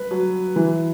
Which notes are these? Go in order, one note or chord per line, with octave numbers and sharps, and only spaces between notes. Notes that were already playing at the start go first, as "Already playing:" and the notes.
Already playing: B4
F#3
E3